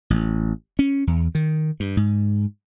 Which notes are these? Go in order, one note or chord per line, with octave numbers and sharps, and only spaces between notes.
A1
C#4
E2
D#3
G2
G#2